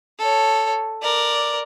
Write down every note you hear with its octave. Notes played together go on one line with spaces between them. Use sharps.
A4 C#5
A#4 D5